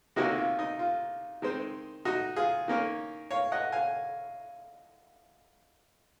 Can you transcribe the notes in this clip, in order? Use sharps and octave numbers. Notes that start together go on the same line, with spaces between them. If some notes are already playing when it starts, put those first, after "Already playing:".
C3 D#3 A#3 C#4 D#4 F#4
F4
D#4
F4
D#3 G#3 C4
D#4 F#4
F4 G#4
D#3 A#3 C#4
C#5 F5
D#5 F#5
F5 G#5